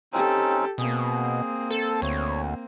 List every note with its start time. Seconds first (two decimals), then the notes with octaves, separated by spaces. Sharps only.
0.13 C4 C#4 D#4 G4 A4
0.78 B2 A#3 C4 G#4
1.71 A4
2.02 D2 C#5